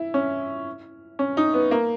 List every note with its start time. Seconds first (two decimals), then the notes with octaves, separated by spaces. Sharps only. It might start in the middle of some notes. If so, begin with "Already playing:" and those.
Already playing: E4
0.14 C#4
1.19 C#4
1.37 D#4
1.54 B3
1.71 A#3